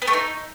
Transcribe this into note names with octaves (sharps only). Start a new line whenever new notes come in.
B3
A3
D#4